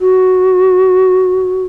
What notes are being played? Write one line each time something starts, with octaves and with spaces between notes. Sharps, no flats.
F#4